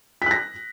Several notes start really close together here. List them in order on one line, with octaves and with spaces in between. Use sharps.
B6 F#6 A#6